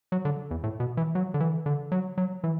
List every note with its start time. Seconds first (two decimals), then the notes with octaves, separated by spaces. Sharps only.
0.12 F#3
0.25 D3
0.51 E2
0.64 A2
0.80 B2
0.97 E3
1.15 F#3
1.34 D3
1.40 E3
1.66 D3
1.92 F#3
2.18 F#3
2.44 E3